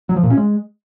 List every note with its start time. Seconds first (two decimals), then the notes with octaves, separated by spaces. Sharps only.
0.09 F#3
0.16 F3
0.23 A#2
0.30 C#4
0.37 G#3